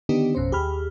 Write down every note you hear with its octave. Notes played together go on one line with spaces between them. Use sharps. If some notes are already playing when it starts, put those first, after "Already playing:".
D3 D#3 B3 D4 D#4 G4
A1 F2 B2 C#4 C5
D#2 G4 G#4 B5 F6